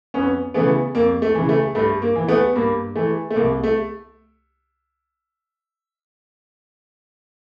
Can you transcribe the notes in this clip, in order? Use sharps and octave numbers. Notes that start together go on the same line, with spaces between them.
F2 B3 C#4
C#3 E3 A3 B3
F2 A#3
A3
C#3 E3
A3
G2 A3
A#3
E3
A3 B3
G2 A#3
E3 A3
A3
C2 A#3
A3